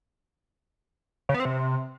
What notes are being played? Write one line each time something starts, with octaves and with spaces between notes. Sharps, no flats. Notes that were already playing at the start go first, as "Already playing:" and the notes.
C#3
B3
C4
C3